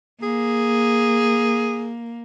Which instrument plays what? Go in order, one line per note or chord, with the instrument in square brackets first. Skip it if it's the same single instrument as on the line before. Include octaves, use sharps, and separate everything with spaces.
[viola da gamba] A#3 [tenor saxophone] G#4